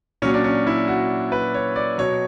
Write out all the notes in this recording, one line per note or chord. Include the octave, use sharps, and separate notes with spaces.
A#2 F#3 C#4
D4
C#4
E4
F#4
B4
C#5
D5
B2 F#3 C#5